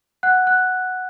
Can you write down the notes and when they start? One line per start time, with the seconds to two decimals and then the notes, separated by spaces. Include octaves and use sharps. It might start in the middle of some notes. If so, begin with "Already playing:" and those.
0.23 F#5 F#6
0.47 F#6